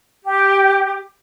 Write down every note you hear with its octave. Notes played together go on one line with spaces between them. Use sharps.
G4